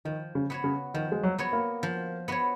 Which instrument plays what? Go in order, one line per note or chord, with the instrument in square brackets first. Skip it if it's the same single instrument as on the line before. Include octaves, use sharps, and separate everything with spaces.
[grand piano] D#3 [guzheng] F3
[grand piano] C#3
[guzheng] B3 F#4 C#5
[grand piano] C#3
[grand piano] D#3 [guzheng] F3
[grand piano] G#3
F#3
[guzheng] B3 F#4 C#5
[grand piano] A#3
[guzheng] F3
B3 F#4 C#5